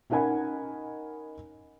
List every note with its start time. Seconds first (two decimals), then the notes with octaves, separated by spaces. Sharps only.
0.10 C#4 D#4 A#4 F#5 G#5 B5